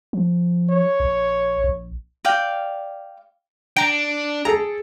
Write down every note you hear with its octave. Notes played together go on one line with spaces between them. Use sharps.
F3
C#5
A#1
A#1
D5 F5 G5
D4 G5 A#5 D7
G#4 A4 A#5